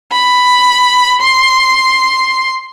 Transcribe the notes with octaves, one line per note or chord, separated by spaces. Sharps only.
B5
C6